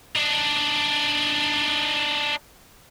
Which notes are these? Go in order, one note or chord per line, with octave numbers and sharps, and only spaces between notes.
D4 D#4